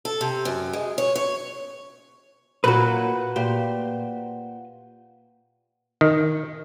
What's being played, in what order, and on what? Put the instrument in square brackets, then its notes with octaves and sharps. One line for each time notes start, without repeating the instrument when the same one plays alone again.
[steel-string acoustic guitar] A4
C3
F#2
G#3
C#5
C#5
[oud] A#2 F#3 [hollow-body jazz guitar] F#4 B4
[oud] A#2 G4 C5
[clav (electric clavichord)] D#3